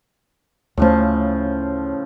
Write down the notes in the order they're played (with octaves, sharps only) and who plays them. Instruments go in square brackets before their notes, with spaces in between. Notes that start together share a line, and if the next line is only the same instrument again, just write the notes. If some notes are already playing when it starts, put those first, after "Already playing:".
[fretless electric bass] D2 A3 [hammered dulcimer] A2 C#3 F3